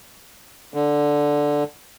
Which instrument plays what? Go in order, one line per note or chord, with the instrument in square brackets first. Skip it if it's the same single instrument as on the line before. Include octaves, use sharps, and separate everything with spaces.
[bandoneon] D3